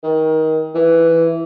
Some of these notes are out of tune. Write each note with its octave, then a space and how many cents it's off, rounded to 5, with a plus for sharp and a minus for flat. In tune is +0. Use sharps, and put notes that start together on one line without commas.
D#3 +25
E3 +5